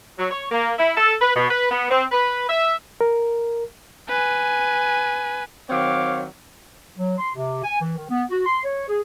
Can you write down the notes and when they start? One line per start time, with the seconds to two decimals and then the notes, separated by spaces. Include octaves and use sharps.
0.19 F#3
0.31 C#5
0.51 A#3
0.78 E4
0.97 A4
1.22 B4
1.36 B2
1.50 B4
1.71 B3
1.91 C4
2.12 B4
2.49 E5
3.01 A#4
4.09 B4 G#5
5.70 D#3 F#3 C4 C#5 F5 D6
6.97 F#3
7.18 C6
7.34 C3
7.63 G#5
7.81 E3
7.97 D#3
8.09 B3
8.30 F#4
8.46 C6
8.64 C#5
8.89 G#4